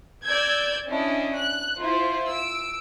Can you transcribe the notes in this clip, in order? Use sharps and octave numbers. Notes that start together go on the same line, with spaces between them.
D5 E6 G6 G#6
C#4 D4 E4 D#5
F#6
E4 F4 C5
E6 D7